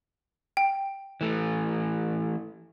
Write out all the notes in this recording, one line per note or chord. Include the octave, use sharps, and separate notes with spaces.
G5
E3 A3